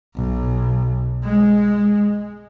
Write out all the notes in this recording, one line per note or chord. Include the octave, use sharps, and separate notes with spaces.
B1
G#3